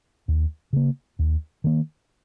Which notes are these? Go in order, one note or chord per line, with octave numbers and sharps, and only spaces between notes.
D#2
C#3 A#3
D#2
D#3 A#3